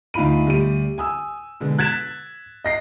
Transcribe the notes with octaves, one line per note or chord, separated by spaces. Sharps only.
D2 D#4 F4 B5 D#7
D2 G3 D#7
G#5 D#6 E6
B2 D3 G#3 B3
F#6 G#6 A6 B6 E7
D#5 A#6 C7